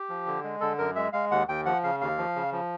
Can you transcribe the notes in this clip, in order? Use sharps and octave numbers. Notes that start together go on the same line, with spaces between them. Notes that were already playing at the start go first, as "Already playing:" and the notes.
Already playing: G4
F3
D3
G#3
D3 A4
F#2 A#4
G#3 E5
G#3 F5
D#2 F#5
D#2 G5
F3 F#5
C#3 F5
D#2 F5
F3
C#3
F3